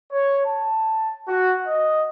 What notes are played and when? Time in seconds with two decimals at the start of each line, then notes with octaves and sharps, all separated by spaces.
0.10 C#5
0.45 A5
1.28 F#4
1.66 D#5